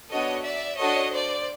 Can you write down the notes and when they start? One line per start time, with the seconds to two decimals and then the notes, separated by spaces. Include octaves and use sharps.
0.10 B3 D4 F#4 A4 C#5 D#5
0.44 D5 E5
0.77 D4 F#4 A4 C#5 D#5
1.12 C5 D5